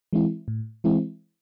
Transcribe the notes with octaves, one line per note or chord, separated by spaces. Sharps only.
E3 G#3 C4 E4
A2
E3 G#3 C4 E4